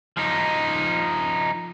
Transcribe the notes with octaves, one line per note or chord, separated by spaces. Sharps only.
F3 D#4